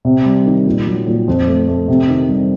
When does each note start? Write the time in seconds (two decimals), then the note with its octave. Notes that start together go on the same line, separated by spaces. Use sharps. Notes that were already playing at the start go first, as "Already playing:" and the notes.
0.05 C3
0.26 G3
0.46 D#3
0.66 A#2
0.87 F#3
1.07 A#2
1.28 F2
1.48 A3
1.68 A3
1.88 C3
2.08 D#3
2.29 G3